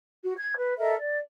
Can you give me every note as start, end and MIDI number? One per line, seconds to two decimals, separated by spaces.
0.22 0.33 66
0.36 0.51 92
0.55 0.76 71
0.78 0.93 69
0.78 0.93 70
0.78 0.93 75
0.78 0.93 76
0.96 1.18 74